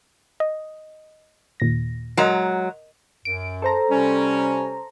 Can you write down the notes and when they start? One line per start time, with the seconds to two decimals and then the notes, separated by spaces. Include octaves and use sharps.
0.40 D#5
1.60 D#2 A#2 A#6
2.17 F#3 G#3 A#4 D#5 A#5
3.25 F#2 D7
3.62 A4 C5 A#5
3.90 C3 G3 C#4